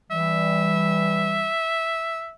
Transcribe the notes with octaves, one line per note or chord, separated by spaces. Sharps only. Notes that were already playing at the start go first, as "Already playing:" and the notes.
E3 G3 E5